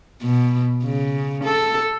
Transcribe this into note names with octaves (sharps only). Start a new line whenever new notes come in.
B2
C#3
A4